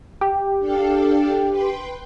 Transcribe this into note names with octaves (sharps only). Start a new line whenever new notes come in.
G4
D4 A4 F5
B4 G5 C6